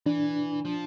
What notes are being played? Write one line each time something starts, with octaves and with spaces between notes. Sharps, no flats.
E3 D4
F3